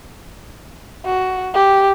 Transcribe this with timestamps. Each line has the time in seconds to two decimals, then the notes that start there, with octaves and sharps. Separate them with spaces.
1.05 F#4
1.54 G4